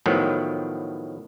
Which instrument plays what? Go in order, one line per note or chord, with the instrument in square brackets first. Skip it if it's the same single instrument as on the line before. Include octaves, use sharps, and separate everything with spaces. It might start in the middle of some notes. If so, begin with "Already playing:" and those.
[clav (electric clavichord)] A2 D#3 F3 F#3 B3